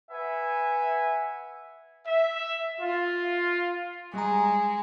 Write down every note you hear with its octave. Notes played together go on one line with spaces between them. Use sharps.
B4 E5 F#5 G#5
E5
F4
G3 G#3 A#5